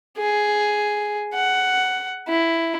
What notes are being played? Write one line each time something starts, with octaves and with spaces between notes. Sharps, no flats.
G#4
F#5
E4